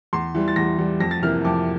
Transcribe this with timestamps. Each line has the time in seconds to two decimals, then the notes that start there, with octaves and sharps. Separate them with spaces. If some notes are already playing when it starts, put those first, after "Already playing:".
0.13 E2 C6
0.35 E3 G3
0.48 A6
0.56 E2 A#6
0.78 E3 G3
1.00 F2 A#6
1.11 A6
1.22 C3 E3 A#3 F6
1.45 F2 D6